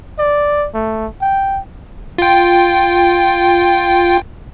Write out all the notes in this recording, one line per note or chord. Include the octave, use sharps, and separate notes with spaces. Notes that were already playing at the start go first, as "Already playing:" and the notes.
D5
A3
G5
F4 G5